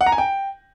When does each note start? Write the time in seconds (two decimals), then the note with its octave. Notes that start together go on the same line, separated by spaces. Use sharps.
0.01 F#5
0.06 A#5
0.12 G#5
0.18 G5